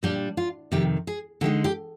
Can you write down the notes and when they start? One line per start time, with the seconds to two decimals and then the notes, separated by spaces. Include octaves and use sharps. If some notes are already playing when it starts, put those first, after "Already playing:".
0.03 A#2 G3 D4 G4
0.37 F4
0.72 F2 C3 D#3 G4
1.07 G#4
1.41 D3 G#3 D#4 G4
1.64 G4